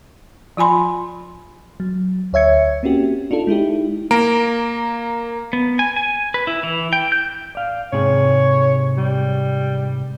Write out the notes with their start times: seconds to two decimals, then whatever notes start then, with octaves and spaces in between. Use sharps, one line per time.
0.57 F3 F4 G#5 B5 C6
1.80 F#3
2.33 D2 C#5 E5 G#6 C#7
2.83 A#3 C4 C#4 F#4 G4
3.31 D4 D#4 F4 A4
3.47 G#3 D#4 E4 G4
4.11 A#3 A#5 D7
5.53 B3
5.79 G#5
5.96 G#5
6.34 B4
6.47 E4
6.63 E3
6.93 G5
7.12 G6
7.55 D5 F5
7.93 G#2 C3 G#4 C#5
8.97 G3